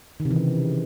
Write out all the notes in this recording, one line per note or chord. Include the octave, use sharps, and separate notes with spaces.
D#3
C3
E3
C#3